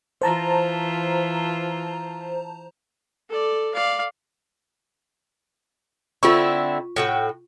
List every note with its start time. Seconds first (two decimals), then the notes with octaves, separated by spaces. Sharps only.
0.22 E3 F4 C5 A5 A#5
3.29 A4 D5
3.74 D5 F5
6.23 D3 C4 E4 F4 C#6
6.96 A2 F#4 G5